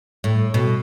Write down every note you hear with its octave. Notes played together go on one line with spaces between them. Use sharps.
A2
B2